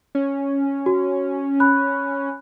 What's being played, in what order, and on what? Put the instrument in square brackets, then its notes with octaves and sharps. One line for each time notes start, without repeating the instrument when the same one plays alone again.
[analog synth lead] C#4
[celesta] F#4
B5 F#6